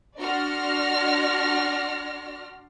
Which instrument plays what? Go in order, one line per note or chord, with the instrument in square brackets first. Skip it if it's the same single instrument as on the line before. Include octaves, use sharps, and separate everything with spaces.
[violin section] D4 F#4 D5 C6 F6 A#6